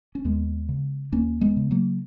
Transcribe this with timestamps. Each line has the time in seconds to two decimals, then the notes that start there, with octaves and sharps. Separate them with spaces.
0.15 C#4
0.25 D#2 G#3 B3
0.69 C#3
1.12 D#2 A#3 C#4
1.41 G#3 B3
1.57 C#3
1.71 F#3 A#3